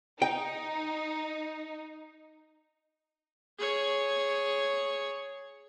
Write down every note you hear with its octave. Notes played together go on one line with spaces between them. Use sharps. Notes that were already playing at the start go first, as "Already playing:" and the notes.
D#4 G5
G#4 C#5